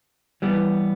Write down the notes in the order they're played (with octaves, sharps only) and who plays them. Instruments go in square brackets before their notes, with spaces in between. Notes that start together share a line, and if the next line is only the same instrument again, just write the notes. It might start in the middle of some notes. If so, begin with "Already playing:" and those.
[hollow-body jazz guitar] E3 G3 B3